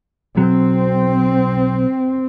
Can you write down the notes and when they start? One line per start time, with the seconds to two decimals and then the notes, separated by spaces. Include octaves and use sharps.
0.37 B1 F#3 C4